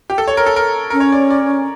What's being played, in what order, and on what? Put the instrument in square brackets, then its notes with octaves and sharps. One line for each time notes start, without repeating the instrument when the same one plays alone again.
[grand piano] G4
A4
C#5
A#4
A4
A#4
[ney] C#4 [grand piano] A#4
[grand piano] C#5
D5
D5